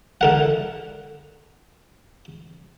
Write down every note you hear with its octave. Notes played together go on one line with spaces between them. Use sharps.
D3 A#4 F#5